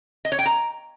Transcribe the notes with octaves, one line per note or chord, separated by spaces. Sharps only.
D#5
C#5
G5
A#5